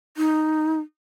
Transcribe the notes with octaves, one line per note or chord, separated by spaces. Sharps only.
D#4